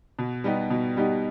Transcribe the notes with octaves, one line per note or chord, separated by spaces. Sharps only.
B2
G3 B3 D#4 G4
B2
G3 B3 D#4 G4